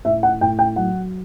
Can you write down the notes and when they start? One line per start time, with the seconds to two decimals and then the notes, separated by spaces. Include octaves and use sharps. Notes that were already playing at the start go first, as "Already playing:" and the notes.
0.05 A2 E5
0.23 F#5
0.41 A2 G5
0.59 G5
0.76 F#3 F#5